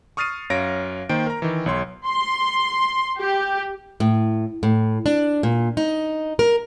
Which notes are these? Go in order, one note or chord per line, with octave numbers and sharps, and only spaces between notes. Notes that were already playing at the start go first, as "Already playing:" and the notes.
C#6 D#6 F6 A6 C7 D#7
F#2 C#5 F5 A#6 D7
D#3 A#3 C5 G5 D7
A#4 A#5
D#3 E3
B1 C#5 C6
C6
G4
A2
A2
D4
A#2
D#4
A#4